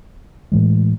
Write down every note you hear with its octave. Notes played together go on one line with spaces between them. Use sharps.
A2 E3 G#3